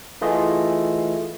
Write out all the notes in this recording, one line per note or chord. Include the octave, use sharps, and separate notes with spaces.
E3 A3 F4 G#4 D#5